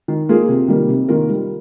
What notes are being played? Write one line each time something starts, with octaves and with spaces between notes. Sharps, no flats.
D#3
A#3 F4 G#4
C3
D#3 G3 A#3
C3
D#3 A#3 F4 A#4
G3